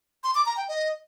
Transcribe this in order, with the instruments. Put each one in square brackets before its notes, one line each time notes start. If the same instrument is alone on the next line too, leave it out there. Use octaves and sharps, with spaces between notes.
[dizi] C6
D6
A#5
G5
D#5